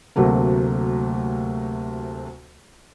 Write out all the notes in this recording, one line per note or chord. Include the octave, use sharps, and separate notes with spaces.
D2 C3 F#3 A3 A#3